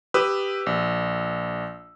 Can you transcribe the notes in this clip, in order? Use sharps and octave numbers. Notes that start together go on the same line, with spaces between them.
G4 B4 D#6 E6
A#1